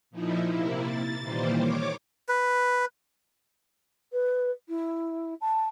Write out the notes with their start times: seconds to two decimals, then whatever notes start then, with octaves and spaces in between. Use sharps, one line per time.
0.11 A#2 F3 D#4 E4
0.47 C3 A#3 E4
0.78 A6
1.21 A#2 D#3 E3 G3 A#3 C5
1.56 C#5 D6
2.29 B4
4.12 B4
4.68 E4
5.41 A5